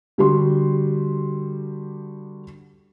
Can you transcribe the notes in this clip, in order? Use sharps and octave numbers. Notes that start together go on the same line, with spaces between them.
D3 G3 F#4 G4 C6